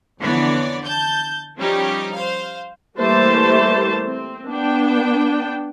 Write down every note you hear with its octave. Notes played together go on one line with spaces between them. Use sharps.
F2 D3 E3 B3 C#5 D5
A5 G6
F3 G3 C#4 D#4 G4
C5 F5
E3 G3 A3 A#3 C5 A5
C4
B3 D4 G5